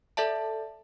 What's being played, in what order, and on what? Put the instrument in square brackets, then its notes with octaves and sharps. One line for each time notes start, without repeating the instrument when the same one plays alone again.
[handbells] A4 D5 E5 A5